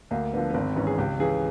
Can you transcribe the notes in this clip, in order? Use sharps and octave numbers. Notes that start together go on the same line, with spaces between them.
D2 A#3
D3 F3 B3
B3
G#1 C4
G#2 E3 C#4
G#4
C#2 G4
C#3 E3 G#4